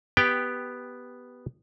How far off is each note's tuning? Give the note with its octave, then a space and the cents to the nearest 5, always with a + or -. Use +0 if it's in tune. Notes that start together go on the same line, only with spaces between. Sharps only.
B3 +0 G4 +0 G5 +10